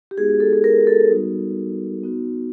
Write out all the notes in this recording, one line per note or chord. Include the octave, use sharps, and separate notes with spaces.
G4
G#3 B3 D#4 F#4 G#4
A4
A4
A#4
A4
G3 B3 D#4 F#4
B3 D#4 F#4